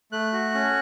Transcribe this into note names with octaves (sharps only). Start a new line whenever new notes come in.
A3 F#6
F#4
C#4